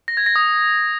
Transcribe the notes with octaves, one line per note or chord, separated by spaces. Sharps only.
A#6
G#6
A#6
D#6